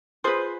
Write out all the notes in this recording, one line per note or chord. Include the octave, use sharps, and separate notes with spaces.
F4 G#4 B4 C5